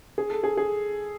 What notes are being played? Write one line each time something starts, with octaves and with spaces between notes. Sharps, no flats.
G#4
A4
G#4
G#4